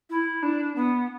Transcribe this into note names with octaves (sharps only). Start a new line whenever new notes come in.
E4
D4
B3